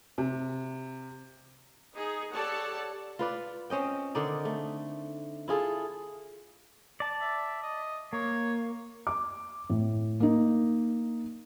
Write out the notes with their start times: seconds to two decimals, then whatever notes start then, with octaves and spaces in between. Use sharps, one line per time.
0.18 C3
1.95 D#4 G#4
2.33 G4 A4 C#5 D5 F#5 A5
3.19 F4 B4 D5
3.70 C4 C#4 D#5 G5
4.15 D3 D#3 D#4 D5
4.45 A3
5.48 E4 F4 G#4 A4
7.00 D5 A5
7.21 E5
7.63 D#5
8.13 A#3 C#5
9.07 D6
9.70 A2
10.20 A#3 D#4